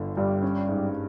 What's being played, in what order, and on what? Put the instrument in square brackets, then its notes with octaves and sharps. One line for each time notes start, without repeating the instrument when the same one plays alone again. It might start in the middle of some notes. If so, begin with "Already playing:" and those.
Already playing: [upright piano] G1 D3
[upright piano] G2 [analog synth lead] G3
[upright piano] C#4
G#2